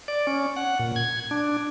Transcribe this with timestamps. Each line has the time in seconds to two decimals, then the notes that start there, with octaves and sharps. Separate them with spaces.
0.08 D5
0.27 C#4
0.56 F#5
0.79 A#2
0.96 G#6
1.31 D4